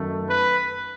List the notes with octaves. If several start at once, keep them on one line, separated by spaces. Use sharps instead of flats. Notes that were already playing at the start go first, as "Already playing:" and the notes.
Already playing: F#2 D#3 F#3 A3
B4